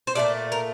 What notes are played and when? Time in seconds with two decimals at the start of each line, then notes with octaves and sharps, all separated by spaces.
0.07 C5
0.15 A#2 F3 A3 D5
0.52 A#4